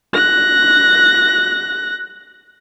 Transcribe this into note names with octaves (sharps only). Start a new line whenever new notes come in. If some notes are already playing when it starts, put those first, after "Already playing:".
F#6 A#6